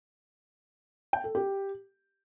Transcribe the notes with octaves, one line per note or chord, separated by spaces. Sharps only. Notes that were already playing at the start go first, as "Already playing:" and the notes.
G5
A4
G4